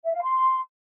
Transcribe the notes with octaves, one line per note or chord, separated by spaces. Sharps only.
E5
F5
C6